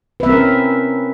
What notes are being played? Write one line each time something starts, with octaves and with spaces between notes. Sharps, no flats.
C4 C#4 A#4 B4 E5